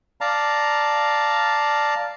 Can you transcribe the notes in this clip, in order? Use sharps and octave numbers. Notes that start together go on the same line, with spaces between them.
D5 F5 A5 A#5